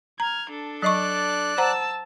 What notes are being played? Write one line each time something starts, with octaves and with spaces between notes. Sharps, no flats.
A#5 F6 G#6
D4 A4
F#3 D5 D#5 C#6 F#6
C5 F#5 A5 A#5 E6